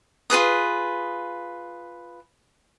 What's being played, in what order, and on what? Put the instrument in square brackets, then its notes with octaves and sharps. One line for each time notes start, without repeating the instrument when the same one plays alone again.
[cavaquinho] F4 G#4 B4 D#6